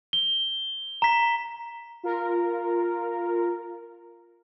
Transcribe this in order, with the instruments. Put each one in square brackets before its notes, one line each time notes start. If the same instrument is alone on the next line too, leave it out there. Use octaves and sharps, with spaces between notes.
[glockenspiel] G7
A#5 B6
[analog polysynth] F4 A#4